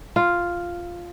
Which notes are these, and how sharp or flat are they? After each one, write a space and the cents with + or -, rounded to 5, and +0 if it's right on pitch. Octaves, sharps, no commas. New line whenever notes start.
F4 +0